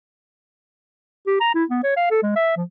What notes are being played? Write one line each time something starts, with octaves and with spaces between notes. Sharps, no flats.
G4
A#5
E4
B3
C#5
F5
A4
G#3
E5
F3